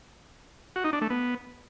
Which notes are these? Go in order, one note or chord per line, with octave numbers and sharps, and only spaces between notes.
F#4
D#4
D4
A3
B3